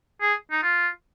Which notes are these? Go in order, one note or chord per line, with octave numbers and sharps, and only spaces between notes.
G#4
D#4
F4